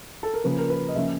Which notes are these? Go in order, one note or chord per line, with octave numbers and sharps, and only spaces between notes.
A4
A#4
C#3 F3 A#3 C#4 B4
A#4
B4
D#5
C#3 F3 A#3 C#4 E5